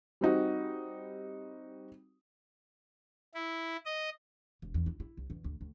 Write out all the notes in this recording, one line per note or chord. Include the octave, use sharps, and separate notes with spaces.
G3 C4 D#4 F#4
E4
D#5
E1
E2
E4
E4
C2
E2
D2
D2